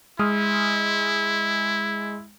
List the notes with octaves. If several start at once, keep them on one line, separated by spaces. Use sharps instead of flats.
G#3 E4 D#6 F6